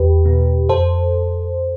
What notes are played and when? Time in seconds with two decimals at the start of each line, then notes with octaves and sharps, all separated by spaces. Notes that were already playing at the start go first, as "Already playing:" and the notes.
Already playing: E2 G4 B4
0.25 B2 B3
0.69 F2 A4 C5